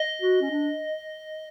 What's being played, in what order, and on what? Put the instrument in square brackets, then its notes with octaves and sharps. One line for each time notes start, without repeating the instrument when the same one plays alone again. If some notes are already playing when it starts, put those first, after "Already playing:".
Already playing: [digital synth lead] D#5
[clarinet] F#4
C#4
D4